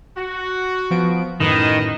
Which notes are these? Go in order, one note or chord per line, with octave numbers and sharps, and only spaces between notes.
F#4
F3 B3 D7
F#2 A2 D#3 B4 D#5